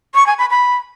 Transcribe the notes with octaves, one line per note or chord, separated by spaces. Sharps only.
C#6
G#5
B5
B5